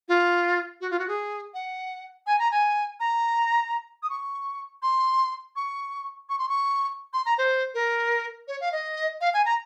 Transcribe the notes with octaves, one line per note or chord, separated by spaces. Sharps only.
F4
F#4
F4
F#4
G#4
F#5
G#5
A#5
G#5
A#5
D#6
C#6
C6
C#6
C#6
C6
C#6
C6
A#5
C5
A#4
C#5
F5
D#5
F5
G#5
A#5